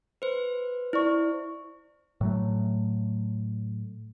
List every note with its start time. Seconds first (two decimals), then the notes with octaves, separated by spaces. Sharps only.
0.22 B4 C5
0.93 E4 C5 D5 C#6
2.21 A2 F#3 A3